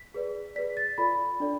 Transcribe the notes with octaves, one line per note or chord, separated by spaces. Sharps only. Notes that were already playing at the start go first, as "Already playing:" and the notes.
Already playing: B6
G#4 B4 D5
G#4 B4 D5 B6
A6
F4 A4 D5 B5
D4 A4 D5